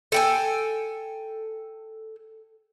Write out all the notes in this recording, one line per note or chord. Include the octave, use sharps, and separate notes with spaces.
A4 G5 G#5